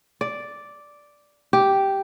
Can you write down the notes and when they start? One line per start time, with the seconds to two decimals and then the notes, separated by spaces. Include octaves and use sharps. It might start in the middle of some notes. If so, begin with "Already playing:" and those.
0.21 D5
1.53 G4